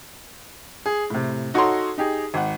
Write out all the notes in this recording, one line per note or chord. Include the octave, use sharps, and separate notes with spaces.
G#4
A2 C3
D#4 F#4 A4 C#5 A#5 C6
D#4 G4 G#4
G#1 F#5